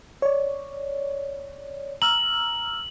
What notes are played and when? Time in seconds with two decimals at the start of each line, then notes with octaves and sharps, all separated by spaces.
0.22 C#5 D5
2.02 A#5 E6 F6 F#7